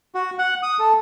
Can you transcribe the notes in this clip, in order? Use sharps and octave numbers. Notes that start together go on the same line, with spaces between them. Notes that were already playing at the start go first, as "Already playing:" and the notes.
F#4
F#5
D#6
A4